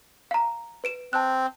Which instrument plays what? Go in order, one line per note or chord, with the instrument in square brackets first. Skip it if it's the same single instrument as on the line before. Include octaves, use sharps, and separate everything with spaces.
[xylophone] F5 A#5
B4 D7 E7
[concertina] C4 [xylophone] A5 F#6